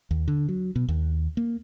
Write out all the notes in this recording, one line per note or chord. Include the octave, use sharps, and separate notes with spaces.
D#2
D3
F#3
B2
D#2
A#3